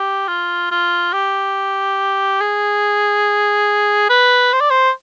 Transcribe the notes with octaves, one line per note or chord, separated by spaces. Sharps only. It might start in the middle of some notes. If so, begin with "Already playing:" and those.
Already playing: G4
F4
F4
G4
G#4
B4
C5
D5
C5